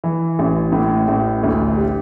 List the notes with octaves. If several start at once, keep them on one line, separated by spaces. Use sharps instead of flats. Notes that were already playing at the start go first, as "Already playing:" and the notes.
E3
A1
A2
A1
D2
G4